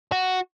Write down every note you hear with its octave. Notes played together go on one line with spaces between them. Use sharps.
F#4